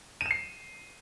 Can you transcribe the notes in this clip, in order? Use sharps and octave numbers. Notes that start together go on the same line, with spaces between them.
C7 D#7 E7